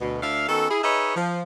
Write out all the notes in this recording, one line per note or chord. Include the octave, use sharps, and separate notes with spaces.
D2 B2
D2 D4 E5 F5
D#3 B3 C#4 F#4 A4
E4 G#4
D#4 G#4 B4 C#5 D#5 E5
F3